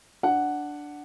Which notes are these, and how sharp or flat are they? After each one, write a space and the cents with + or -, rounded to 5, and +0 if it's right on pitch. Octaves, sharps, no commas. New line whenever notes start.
D4 +0 F#5 +0